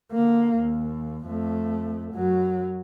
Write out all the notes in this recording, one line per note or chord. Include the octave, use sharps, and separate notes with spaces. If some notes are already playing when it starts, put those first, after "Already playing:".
D3 A#3
D#2
F2 A3
F#2 F#3